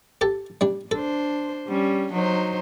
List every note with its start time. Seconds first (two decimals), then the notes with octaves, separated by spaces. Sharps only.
0.21 G4 A4 A5
0.61 G3 D4
0.91 D4 A4 C5
1.68 G3 C#4
2.13 F#3 D#4 C5